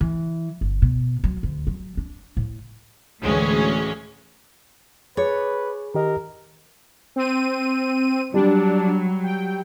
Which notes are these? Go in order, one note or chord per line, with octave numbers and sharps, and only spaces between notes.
E3
G1
B2
F#3
D2
F#3
D4
A2
D2 A2 E3 G#3 C#4
G#4 B4 C#5
D#3 G4 A#4 D#5
C4 D#7
F#3 G3 D4
G5